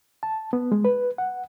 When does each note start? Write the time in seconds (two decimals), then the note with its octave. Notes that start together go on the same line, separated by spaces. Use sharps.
0.23 A5
0.53 B3
0.72 G#3
0.85 B4
1.18 F#5